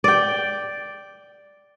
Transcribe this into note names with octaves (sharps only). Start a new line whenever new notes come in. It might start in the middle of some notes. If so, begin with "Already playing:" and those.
D5 G5